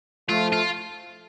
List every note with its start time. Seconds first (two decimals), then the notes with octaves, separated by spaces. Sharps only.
0.29 F3 A3 F4
0.52 F4